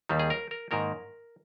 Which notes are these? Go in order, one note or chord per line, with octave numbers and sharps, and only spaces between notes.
D#2 D#3 G3
G#4
A#4
A#4
G#2 D#3 A#3 A#4